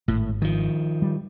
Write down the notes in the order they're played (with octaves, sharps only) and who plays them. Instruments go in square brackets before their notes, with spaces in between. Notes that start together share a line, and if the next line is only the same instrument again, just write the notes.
[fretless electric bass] G#1 [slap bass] A2
[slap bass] D#3 F3
[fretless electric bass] G3